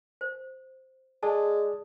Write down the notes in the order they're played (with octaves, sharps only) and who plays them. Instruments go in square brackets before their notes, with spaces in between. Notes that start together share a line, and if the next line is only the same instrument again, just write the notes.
[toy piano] C5
[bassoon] G#3 [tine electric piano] G#4 D5 [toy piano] A5